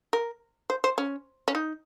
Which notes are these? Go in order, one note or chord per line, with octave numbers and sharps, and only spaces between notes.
A#4
C5
C5
C#4
C#4
D#4